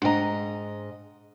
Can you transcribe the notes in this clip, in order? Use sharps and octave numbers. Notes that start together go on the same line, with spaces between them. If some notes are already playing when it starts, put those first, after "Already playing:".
G#2 D4 B4 D#5 G5 A#5